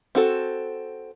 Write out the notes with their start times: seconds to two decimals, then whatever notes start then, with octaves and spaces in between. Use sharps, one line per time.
0.15 C4 F#4 A4